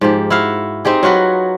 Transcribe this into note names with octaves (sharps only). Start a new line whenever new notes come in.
G#2 F3 G4
E4 F#4 F5
C4 D#4 G4 G#4
F#3 F4 F#4 B4